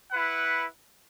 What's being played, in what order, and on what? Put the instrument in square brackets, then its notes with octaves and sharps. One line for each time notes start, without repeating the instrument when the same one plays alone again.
[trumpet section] E4 B4 F#5